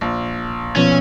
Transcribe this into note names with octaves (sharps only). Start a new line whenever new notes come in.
A#1
B2 F3 B3 C#4